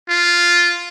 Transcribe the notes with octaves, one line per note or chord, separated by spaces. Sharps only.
F4